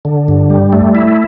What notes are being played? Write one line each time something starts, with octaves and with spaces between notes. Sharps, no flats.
D3
G2
G3
A3
E4